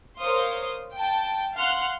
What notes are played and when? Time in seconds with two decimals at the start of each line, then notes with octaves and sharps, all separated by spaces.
0.20 A#4 C5 C#5 F5 C6 D#6
0.94 G5 A5
1.55 F5 F#5 C6 F6 F#6